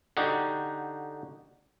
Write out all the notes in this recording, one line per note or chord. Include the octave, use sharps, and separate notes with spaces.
D3 D#4 F#4 G4